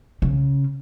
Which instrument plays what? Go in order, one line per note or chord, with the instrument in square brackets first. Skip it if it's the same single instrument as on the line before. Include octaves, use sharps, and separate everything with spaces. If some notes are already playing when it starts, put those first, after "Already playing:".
[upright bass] C#3